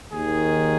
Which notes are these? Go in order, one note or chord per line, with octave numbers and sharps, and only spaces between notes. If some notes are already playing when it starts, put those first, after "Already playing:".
D#2 D#3 G#4